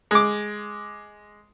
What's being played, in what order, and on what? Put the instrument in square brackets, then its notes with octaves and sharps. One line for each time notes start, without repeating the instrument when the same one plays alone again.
[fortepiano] G#3 D6